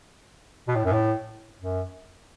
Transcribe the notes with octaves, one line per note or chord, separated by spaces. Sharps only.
B2
A2
F#2
A2
F#2